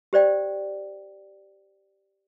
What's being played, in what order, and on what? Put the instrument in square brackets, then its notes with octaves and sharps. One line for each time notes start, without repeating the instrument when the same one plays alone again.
[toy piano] G4 C5 D5 G5